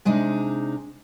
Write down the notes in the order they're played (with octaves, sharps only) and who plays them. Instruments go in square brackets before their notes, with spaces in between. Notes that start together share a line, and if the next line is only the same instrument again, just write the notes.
[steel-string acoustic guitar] C3 G#3 D4 D#4